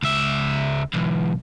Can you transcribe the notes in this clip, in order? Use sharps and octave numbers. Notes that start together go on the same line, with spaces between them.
C#2 E5
B1 E2